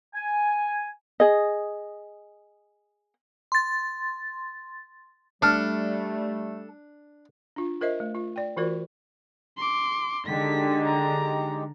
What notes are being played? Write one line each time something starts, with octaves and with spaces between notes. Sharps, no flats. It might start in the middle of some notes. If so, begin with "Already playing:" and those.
G#5
G#4 D#5
C6 A6
G3 A3 D4 A4 F6
D4 F4
F4 A#4 C5 D#5 E5
A3
F4
D5 G5
E3 F4 F#4 A#4 C5 D5
C6 D6
D3 G#3 D#4 G4 B6
A#5